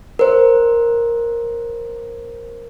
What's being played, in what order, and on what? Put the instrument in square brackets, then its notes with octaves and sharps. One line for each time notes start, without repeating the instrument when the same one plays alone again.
[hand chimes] A#4 C5